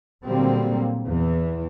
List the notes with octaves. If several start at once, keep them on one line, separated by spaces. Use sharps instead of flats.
A#2 D3 F#3 G3 A#3 C4
E2 E3